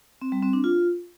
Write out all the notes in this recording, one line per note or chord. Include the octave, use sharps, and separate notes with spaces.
C4
G3
C4
D4
F4